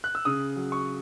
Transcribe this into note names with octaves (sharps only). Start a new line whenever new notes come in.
F#6
E6
C#3 D#6
F#3
C#6